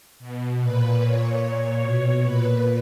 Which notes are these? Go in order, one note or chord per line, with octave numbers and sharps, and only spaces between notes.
B2
A#2 B4
A#2 C#5
A#2 C#5
B2 C#5
A#2 B4